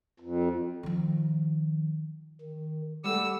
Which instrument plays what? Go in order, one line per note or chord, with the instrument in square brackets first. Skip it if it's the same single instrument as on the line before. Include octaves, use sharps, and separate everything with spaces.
[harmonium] F2
[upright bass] D#3 F3
[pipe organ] D#3
[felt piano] G3 A3 [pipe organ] G4 F#5 [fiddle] E6